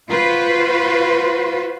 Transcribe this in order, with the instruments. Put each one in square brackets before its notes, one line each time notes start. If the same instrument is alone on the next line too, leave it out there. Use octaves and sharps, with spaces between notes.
[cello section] F4 F#4 B4 C5